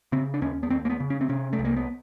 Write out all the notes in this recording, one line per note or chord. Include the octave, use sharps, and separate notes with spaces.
C#3 C4
D4
D#2 C#4
B3
D#2 C4
A#3
B3
C#3
C#4
C4
C3 C#4
A3
C2
A#3
B3